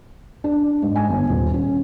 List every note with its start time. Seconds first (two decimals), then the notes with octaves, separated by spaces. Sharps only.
0.44 D4
0.82 G#2
0.96 G#5
1.09 G1
1.29 D#1
1.54 C#4